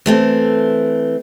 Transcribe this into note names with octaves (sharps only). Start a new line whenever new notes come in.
E3 A3 C4